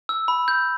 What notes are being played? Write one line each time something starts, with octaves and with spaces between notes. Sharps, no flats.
E6
B5
G6